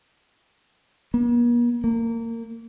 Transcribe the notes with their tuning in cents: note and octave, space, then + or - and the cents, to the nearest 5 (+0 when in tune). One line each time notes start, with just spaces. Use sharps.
A#3 +45
A#3 -25